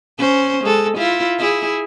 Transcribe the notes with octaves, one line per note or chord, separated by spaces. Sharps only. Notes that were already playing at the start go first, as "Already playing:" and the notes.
C#4 C5
G#3 A4
E4 F4
E4 G#4